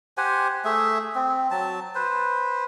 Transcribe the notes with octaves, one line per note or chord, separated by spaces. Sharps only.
G4 C5 F#5 G#5
A3 G#4 E5
C4
F#3 A5
B4 C5